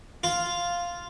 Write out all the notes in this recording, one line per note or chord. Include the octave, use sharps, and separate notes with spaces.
F4